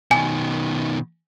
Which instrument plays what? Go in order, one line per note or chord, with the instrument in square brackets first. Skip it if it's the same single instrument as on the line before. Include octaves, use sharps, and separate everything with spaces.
[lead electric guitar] B2 D#3 [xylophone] G#5